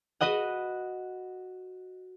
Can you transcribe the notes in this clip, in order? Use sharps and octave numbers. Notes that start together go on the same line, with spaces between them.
F#4 B4 D#5 F#5